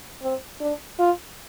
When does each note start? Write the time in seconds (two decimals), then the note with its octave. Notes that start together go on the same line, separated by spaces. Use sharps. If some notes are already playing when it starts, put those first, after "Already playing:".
0.23 C4
0.60 D4
0.99 F4